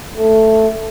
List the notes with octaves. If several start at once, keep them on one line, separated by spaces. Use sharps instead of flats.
A3